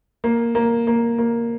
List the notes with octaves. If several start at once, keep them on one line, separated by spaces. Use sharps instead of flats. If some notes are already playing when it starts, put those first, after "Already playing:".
A#3
A#3
A#3
A#3